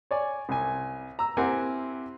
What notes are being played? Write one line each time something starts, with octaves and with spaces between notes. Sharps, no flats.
C#5 D5 G#5
C2 G#5
A#5 E6
C4 E4 G4 A#4 F#5 G#5